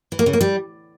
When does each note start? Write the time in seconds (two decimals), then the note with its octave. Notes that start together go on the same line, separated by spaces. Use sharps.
0.12 E3
0.19 A#3
0.26 C#3
0.33 A#3
0.41 G3